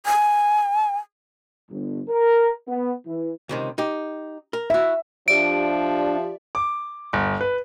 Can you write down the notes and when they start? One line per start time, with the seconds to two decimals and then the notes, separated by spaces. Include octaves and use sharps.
0.06 G#5
1.70 G1
2.09 A#4
2.68 B3
3.06 E3
3.49 C#2 C3 D#3
3.78 D#4 G4
4.53 A#4
4.70 E4 F#4 E5
5.28 F3 D4 G4 D5 E5 D7
6.55 D6
7.13 G1
7.41 B4